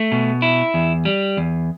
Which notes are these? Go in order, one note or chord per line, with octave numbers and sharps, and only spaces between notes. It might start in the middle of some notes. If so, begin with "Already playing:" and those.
Already playing: A3
B2
E4
E2
G3
E2